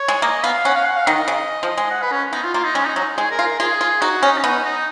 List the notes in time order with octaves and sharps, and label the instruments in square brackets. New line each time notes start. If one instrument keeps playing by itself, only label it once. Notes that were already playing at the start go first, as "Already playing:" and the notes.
Already playing: [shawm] C#5
[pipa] G#3
[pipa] A#3 [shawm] D#5
[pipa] B3 [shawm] F5
[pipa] C#4 [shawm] F#5
[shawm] F5
F#5
F5
[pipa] D#3 [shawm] D#5
[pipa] C#3
F3
G#3
[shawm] F#5
B4
C#4
[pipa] B3 [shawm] D#4
[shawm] F4
[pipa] A#3 [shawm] F4
[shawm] D#4
[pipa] G#3 [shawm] C#4
[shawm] D#4
[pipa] F#3 [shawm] D#4
[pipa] G#3 [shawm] G#4
[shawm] A#4
[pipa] F4
[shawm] A#4
[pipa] F4 [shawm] G#4
[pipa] F4
[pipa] D#4 [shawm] F#4
[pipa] C#4 [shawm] D#4
[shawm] C#4
[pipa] B3 [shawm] D#4
[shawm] D#4